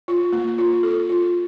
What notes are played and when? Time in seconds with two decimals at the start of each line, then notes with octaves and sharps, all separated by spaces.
0.08 F4
0.32 A#3
0.58 F4
0.83 A4
1.09 F4